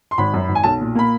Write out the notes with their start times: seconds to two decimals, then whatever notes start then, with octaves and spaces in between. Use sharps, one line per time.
0.11 C6
0.18 G#1 B5
0.34 F#2
0.48 G#1
0.55 G#5
0.63 B1 A5
0.80 A#2
0.95 A#3 B5